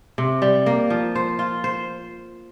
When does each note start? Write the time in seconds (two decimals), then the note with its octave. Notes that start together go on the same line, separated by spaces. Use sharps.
0.18 C3
0.42 G3
0.66 A#3
0.90 F3
1.15 C5
1.39 F4
1.64 C5